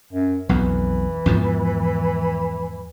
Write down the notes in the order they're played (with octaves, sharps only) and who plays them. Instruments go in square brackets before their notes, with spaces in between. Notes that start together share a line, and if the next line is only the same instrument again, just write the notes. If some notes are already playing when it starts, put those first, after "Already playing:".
[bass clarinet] F#2
[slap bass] B1 F2 [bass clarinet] E3
[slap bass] E2 G#2 F3